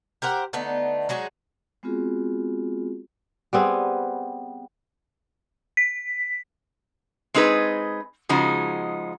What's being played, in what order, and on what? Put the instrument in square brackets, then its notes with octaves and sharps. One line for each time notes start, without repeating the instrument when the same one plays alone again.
[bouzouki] G4 A#4 C5 F#5
D3 A3 B3 D#4
F#3 G#3 D#4 F#4
[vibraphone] G#3 B3 C4 F4 F#4 G#4
[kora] G3 B3 C4 G#4
[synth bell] B6
[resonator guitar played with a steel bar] G#3 C4 D#4 G#4 B4
C#3 F3 G#3 D#4 F#4